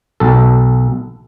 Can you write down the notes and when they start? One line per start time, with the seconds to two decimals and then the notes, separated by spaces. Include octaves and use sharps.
0.20 B1 A4